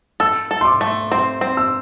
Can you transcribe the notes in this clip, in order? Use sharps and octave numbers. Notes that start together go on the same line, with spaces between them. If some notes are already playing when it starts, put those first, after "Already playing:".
A4 E6
A4
C6
D6
A3
C4 C6
C4
E6